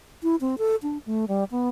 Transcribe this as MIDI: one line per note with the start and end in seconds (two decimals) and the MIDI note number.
0.23 0.36 64
0.41 0.55 60
0.58 0.76 69
0.83 0.98 62
1.06 1.25 57
1.28 1.44 55
1.51 1.69 59